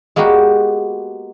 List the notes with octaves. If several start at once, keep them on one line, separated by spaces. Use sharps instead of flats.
G#3 A#3 B3 F#4 G4